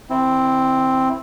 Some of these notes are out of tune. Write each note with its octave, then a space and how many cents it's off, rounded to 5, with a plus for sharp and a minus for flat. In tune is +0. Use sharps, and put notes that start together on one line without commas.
D#3 -40 C4 +0 E4 +0